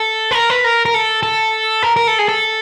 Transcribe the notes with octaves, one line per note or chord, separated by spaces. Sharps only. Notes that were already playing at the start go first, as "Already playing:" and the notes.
Already playing: A4
B4
A#4
B4
A#4
A#4
A4
A4
A#4
A#4
A4
G#4
A4